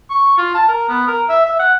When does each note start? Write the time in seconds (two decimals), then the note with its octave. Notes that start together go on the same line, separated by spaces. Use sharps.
0.10 C#6
0.38 F4
0.55 A5
0.68 A#4
0.89 B3
1.08 A#4
1.29 E5
1.46 E5
1.59 F#5